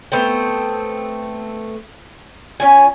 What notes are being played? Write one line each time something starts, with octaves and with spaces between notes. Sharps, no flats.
A3 B3 C4 G5
C#4 F4 G#5